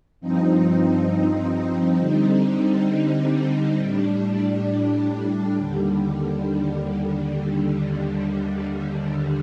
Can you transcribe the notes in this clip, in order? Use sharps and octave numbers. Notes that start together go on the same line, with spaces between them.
G2 F3 C4 D#4
D3 G3 C4 D#4
A2 G3 D4
D#2 D3 G3